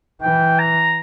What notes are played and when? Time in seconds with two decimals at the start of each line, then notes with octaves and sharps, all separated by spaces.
0.21 E3 G5
0.59 A#5